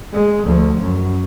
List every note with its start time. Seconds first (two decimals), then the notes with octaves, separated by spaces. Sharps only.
0.13 G#3
0.45 D2 F3
0.80 F#2